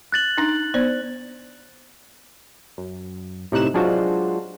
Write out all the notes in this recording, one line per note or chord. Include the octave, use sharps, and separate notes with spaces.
F#6 A6 F#7
D4 D#4
B3 C5 D5
F#2
A2 C3 D#4 F#6 E7
F#3 G#3 D4 F4 F#4 C5